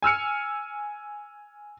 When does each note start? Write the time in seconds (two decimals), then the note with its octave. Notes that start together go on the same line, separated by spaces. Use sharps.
0.02 G#5 E6 F6 C#7